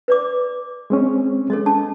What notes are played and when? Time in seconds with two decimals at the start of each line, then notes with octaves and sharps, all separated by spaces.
0.08 B4 D5 D6
0.90 G#3 C4 C#4
1.50 G#3 A4 C#5 D#5
1.66 C#4 A5